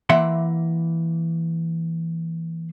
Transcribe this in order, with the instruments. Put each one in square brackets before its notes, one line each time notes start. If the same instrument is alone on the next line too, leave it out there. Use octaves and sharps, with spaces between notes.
[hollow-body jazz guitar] E3 A#3 E5 F#5 C6